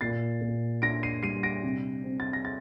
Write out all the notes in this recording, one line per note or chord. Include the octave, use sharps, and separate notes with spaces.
A#2 A6 C7
A#2
D4 A#6 D7
C7 D#7
G3 C7 D#7
A#6 D7
C3
C4
A6
A#6
A6